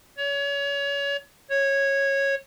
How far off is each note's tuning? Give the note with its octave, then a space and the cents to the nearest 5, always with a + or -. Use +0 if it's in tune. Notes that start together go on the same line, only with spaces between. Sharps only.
C#5 +30
C#5 -10